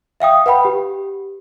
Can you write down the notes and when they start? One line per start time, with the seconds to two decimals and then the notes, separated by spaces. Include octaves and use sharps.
0.20 E5 F5 G5 D#6
0.46 B4 F#5 G5 B5
0.65 G4